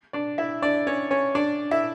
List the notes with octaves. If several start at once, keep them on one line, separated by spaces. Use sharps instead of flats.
D4 D5
E4 E5
D4 D5
C#4 C#5
C#4 C#5
D4 D5
E4 E5